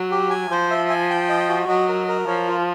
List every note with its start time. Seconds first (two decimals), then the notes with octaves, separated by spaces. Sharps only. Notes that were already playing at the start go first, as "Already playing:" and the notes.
Already playing: F#3
0.11 G4
0.30 G#5
0.50 F3 C5
0.70 E5
0.90 G#5
1.10 G5
1.29 D#5
1.49 F#4
1.68 F#3 D#5
1.89 A#4
2.08 A#4
2.27 F3 C#5
2.48 F4